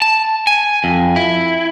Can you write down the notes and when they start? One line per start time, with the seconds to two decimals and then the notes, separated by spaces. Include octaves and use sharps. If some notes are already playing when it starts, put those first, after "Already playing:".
0.02 A5
0.47 G#5
0.84 F2
1.16 E4